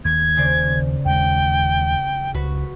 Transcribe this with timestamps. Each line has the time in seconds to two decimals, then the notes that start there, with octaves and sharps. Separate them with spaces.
0.05 D#2 G#6
0.37 C#3 C5 D5
1.05 D#2 G#3 G5
2.34 C#2 F#4 B4